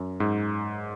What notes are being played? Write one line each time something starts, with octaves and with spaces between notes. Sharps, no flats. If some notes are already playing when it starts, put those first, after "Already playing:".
Already playing: F#2
G#2